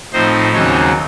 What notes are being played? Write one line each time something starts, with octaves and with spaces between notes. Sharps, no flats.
A2 F3 C4 D#4 C5
D#2 C#3 F#3 C4 D#4 C#5